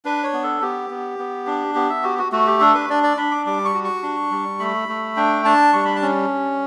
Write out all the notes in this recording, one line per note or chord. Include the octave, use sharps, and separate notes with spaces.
D4 B4
C#5
B3
A4
B3 G4
B3
B3
D4
B3 G4
E5
F#4 G4
F#4
A3 F#4
G4
D4 A4
B4
D4 D5
D5
D4 B5
D6
G3 D6
C#6
F#4
C#6
D4
G3
A3 B5
A3
D4 G5
D4 A5
G3 C#6
B5
A5
C#4